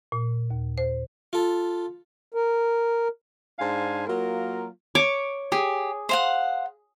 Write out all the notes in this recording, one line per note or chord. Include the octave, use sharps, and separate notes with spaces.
A#2
D#2
C5
F4 A4
A#4
G#2 D4 C5 F5 G#5 A5
F#3 A#3 F4 A#4
C#5 D6
G4 G#4
C5 F5 F#5